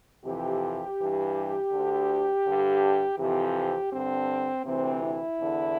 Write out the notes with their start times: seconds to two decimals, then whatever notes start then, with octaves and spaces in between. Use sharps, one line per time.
0.25 F2 C3 E3 G4
0.98 G2 E3
1.72 D2 D3
2.45 G2 D3
3.18 F2 C3 E3 G4
3.92 G2 D3 C4
4.65 D2 C3 E3 C4
5.02 E4
5.39 E2 D3